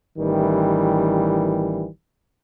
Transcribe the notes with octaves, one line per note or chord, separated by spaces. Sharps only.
A1 D#3 E3 G3